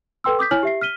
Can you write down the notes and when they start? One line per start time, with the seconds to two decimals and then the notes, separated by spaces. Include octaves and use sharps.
0.24 A4 B4 G5 C6 E6
0.39 D6 D#6 G6 B6
0.51 E4 C#5 G#5 F6 F#7
0.63 G4 E5 C7
0.81 F6 B6 D#7 G7